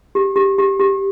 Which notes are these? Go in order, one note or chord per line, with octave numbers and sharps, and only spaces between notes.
G4
G4
G4
G4